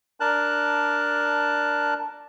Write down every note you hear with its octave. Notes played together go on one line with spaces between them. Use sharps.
D4 A#4 A5 F#6